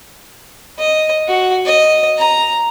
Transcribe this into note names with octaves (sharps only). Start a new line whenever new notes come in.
D#5
F#4
D#5
A#5